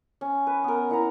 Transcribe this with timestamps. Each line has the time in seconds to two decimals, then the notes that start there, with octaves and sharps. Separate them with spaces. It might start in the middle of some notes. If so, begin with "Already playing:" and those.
0.21 C#4
0.47 B4
0.64 B3 A#4
0.89 A#3 E4 F#5 A#5